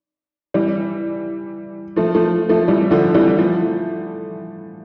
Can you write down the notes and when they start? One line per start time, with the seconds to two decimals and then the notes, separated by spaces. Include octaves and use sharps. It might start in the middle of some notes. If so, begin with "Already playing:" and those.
0.54 E3 G3
1.96 F3 A3
2.15 F3 A3
2.49 F3 A3
2.68 E3 G3
2.91 D3 F3
3.14 E3 G3
3.38 F3 A3